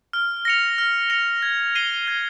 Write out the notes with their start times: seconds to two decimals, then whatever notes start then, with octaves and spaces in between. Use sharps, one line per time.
0.13 F6
0.45 A#6 C#7 F7
0.78 F6
1.10 A#6 C#7 F7
1.42 G#6
1.75 C7 D#7 G7
2.08 G#6